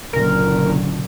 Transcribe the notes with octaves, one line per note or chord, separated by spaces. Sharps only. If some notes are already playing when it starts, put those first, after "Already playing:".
F#1 A#2 D3 A#4